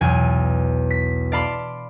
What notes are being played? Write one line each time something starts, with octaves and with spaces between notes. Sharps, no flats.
B1 E2 G#5 G#6
B6
D5 F5 A5 B5 C6 D6